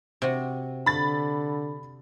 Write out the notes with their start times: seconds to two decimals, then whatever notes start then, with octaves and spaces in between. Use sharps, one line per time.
0.22 C3 F#4
0.86 D3 B5 A6